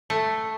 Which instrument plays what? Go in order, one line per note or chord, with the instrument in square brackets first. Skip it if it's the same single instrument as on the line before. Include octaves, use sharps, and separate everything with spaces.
[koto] A3